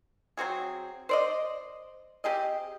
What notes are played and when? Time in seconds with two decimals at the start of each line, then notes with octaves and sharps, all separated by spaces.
0.37 F#3 C4 F#4 G#4
1.09 C5 D5 D#5
2.24 C4 G4 G#4 D#5